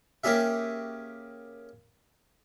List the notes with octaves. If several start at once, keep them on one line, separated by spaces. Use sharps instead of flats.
A#3 C#4 G4 G#4 E5